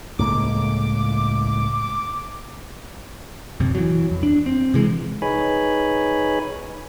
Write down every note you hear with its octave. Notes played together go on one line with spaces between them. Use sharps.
C#2 A2 A#3 D6
D#1 F#2 C3
E3 F#3
F2
D4
C4
C3 E3 G#3
D#4 G#4 B4 C#5 G#5 B5